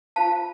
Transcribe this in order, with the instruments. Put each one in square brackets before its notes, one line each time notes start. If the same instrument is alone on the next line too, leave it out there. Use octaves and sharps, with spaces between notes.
[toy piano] F4 C5 F5 A5